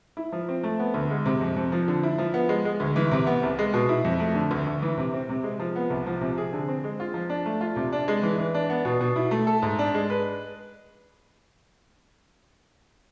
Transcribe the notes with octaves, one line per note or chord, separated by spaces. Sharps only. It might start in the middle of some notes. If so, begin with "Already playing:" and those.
E4
F3
C4
A3
B3
D2
G#3
C3
F2
F2
F3
D3
E4
F3
B3
G#3
G#3
D2
E3
C3
B3
C2
G#3
B2
E4
F2
A3
D3
D2
D2
E3
C3
C4
C3
G#3
F3
B3
C2
F3
C3
G#4
D3
C4
G#3
F4
F3
D4
A3
F4
C3
D4
G#3
E3
E3
D4
B3
B2
B2
E4
A3
A4
G#2
D4
G#3
B4